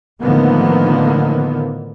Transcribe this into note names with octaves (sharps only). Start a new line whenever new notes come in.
A2 D3 D#3 F3 A#3 B3